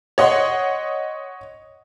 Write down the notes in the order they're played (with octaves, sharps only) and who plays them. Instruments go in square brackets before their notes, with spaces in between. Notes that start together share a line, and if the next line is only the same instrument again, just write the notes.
[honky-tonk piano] C#5 D#5 F#5 C6